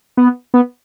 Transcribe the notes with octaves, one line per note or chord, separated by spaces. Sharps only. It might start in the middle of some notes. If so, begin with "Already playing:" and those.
B3
B3